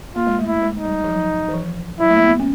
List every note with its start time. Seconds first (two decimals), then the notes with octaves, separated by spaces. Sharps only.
0.16 A#3 F4
0.27 G#3
0.39 A3
0.46 E4
0.62 G#3
0.77 D#4
0.85 G3
1.04 F3
1.08 F#3
1.48 E3
1.54 F3
2.00 F#3 E4
2.10 A3
2.16 A#3
2.24 B3
2.40 C#4